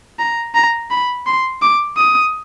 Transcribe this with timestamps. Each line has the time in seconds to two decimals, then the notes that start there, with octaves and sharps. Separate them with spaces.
0.19 A#5
0.55 A#5
0.90 B5
1.26 C6
1.62 D6
1.97 D#6